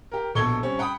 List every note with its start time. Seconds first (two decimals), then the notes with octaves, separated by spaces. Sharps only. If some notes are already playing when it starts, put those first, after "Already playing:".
0.11 G4 A#4
0.35 A#1 B2 A4 C#6 G#6 G7
0.63 G3 C4 C#4
0.79 F#5 G5 B5 D#6